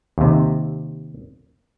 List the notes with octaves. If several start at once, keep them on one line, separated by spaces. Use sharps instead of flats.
D#2 C3